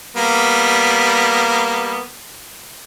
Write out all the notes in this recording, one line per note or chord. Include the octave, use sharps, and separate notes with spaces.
G3 A#3 B3